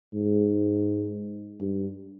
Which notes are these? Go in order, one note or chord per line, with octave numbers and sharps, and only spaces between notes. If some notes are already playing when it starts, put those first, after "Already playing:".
G#2
G2